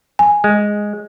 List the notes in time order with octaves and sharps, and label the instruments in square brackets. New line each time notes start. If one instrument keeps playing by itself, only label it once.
[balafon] G#5
[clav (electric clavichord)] G#3